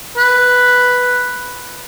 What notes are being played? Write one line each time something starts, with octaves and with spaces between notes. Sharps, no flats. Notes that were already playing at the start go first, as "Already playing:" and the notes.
B4